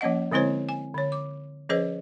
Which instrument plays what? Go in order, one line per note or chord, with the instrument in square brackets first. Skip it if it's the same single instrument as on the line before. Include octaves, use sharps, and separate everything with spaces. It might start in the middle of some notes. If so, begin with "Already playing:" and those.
[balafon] F3 A#3 C#4 D#5 F#5
D3 G#3 C4 E4 C5 C#5
G#5
D3 C#5
D6
F3 C#4 G#4 B4 C5 D#5